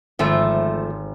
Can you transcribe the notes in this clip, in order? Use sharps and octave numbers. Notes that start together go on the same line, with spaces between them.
G#1 F3 A3 C4